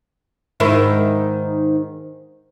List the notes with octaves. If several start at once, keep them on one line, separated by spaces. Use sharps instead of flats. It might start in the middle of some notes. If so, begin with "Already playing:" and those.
G#2 D#3 E4